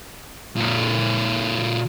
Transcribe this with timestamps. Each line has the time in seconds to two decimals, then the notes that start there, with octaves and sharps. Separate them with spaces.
0.56 A#2 A4